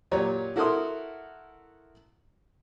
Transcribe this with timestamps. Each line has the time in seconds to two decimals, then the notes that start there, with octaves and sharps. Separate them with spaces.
0.11 A#2 F#3 G4 C#5 D5 A#5
0.56 E4 F#4 A4 A#4 C6 D#6